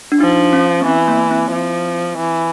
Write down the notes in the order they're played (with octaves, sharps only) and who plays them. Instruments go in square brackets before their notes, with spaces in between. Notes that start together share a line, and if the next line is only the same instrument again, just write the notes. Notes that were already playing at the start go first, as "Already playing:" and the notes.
[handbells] D4
[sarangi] F3 [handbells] D#4
[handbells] C#4
B3
[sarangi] E3 [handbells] C4
[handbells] A#3
C4
[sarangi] F3
E3